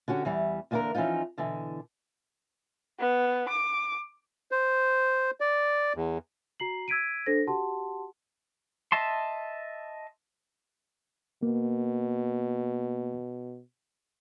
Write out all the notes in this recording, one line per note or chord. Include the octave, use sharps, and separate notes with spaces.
D3 C#4 F#4 G4
E2 E3 G3
E2 D3 A#3 B3 D4 A#4
E3 F3 C#4 D#4 F4
B2 D3 E3
B3
D6
C5
D5
E2
F#4 A#5 C7 F#7
E6 G#6 B6 D7 D#7
D4 A4 C5 A#6
F#4 G4 F#5 A5 C6
D#5 E5 A5 C6
B2 A#3